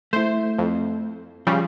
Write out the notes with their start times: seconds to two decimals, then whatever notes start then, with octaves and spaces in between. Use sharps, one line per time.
0.13 A3 E4 C5
0.59 F2
1.47 C#3 F3 G3